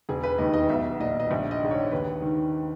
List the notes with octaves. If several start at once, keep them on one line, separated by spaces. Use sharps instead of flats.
E1 G#4
B4
D#2 D#3 D#5
D#5
B1 E5
A#2 D#5
D#5
A#1 E5
D#5
G#2 D#3
C#5
D#2 B4
D#3